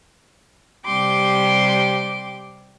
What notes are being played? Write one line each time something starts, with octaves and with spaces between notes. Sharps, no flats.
C3 G3 G5 C6 D6